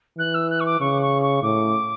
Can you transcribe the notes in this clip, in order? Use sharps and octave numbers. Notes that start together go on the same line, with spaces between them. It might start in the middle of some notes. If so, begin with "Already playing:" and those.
E3 F#6
E6
F#6
C#6
D6
C#3 C#6
C#6
C#6
A2 D6